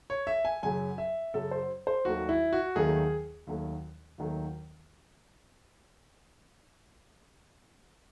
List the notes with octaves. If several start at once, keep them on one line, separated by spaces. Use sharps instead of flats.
C#5
E5
G#5
F#2 C#3 F#3 G#5
E5
F#2 C#3 F#3 A4
C5
C5
D#2 D#3 F#3 A3 F#4
E4
F#4
D#2 D#3 F#3 A3 G#4
D#2 D#3 F#3 A3
D#2 D#3 F#3 A3